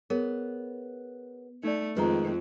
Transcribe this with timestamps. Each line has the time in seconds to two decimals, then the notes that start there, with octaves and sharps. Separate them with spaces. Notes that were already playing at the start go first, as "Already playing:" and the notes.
0.10 B3 G#4 A#4 C#5
1.63 A3 D#4 D5
1.97 F2 D#3 G#3 B4 A#5